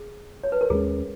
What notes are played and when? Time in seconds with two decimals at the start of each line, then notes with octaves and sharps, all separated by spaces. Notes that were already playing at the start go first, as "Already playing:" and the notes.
Already playing: G#4
0.44 C#5
0.52 B4
0.61 A#4
0.70 D#2 D#3 G#3 C#4 G#4